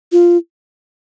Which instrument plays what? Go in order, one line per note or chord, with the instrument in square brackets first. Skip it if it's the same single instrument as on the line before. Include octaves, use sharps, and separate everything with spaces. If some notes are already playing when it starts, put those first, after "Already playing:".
[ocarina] F4